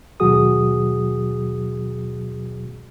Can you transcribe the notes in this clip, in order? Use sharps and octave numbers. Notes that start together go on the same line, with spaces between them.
D#2 B2 F#3 F#4 G#4 D#6